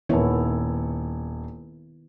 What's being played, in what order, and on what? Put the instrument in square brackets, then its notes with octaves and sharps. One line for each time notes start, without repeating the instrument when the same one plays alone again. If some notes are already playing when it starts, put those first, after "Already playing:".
[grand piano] D#1 C#5 [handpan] D#3 B3 E4